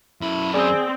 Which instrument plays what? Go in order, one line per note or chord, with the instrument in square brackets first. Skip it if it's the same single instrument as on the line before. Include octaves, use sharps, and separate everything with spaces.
[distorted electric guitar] F#2 B5 [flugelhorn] E4
[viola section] C4 [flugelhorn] G#4 [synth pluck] D5 D#6